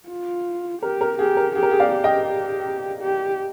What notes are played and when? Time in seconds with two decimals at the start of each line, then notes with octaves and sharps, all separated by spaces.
0.09 F4
0.82 G4 A#4
1.01 A#4
1.19 G4 G#4
1.37 A#4
1.55 G4 G#4
1.63 A#4
1.71 G#4
1.80 D5 F5
1.93 G4
2.04 D#5 G5
3.02 G4